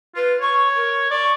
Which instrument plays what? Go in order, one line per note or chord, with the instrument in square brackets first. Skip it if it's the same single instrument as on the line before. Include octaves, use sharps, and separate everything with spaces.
[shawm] F4 [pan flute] B4
[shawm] C#5 [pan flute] C#6
[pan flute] A#4
[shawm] D5 [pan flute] C#6